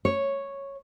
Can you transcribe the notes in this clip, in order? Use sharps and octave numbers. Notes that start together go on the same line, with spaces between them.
C#5